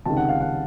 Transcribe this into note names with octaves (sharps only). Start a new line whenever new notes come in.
C#2 C3 D#3 A5
F#5
F5
F#5